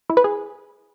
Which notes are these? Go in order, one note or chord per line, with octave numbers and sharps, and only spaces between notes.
E4
B4
G#4